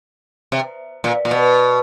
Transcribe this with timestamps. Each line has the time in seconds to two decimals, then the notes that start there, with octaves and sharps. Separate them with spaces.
0.52 C3
1.04 A#2
1.25 A#2
1.31 B2